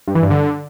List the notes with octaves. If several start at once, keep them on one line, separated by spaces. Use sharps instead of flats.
G2
E3
G2
D3